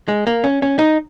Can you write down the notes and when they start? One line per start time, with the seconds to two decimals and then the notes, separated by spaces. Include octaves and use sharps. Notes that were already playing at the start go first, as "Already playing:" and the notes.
0.08 G#3
0.27 A#3
0.44 C#4
0.62 C#4
0.79 D#4